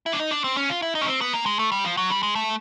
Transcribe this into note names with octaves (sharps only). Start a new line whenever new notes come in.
E4
D4
D#4
D4
C4
C#4
F4
E4
D#4
C#4
C4
B3
A#3
G#3
A3
G3
F3
F#3
G3
G#3
A3